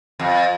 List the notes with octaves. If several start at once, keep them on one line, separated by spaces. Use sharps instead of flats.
F2